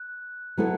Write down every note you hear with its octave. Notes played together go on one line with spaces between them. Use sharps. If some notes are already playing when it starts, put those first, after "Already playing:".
Already playing: F#6
F#3 B3 E4 A4